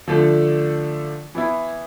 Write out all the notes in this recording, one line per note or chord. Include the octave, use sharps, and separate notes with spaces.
D3 F3 A3 D4 A4
E3 B3 E4